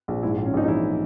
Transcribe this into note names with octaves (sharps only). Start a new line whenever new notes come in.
A#1
G#2 E4
A#1
C#4
A#1 D#4
D#4
E3 E4